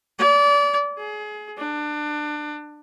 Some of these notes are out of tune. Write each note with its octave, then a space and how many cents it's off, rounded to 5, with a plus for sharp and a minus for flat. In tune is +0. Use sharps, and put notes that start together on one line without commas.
D5 -30
G#4 +25
D4 +25